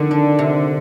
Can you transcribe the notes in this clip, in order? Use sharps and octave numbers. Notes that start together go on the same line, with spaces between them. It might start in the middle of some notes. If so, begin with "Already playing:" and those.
Already playing: F2 D3 D#3
D4
C3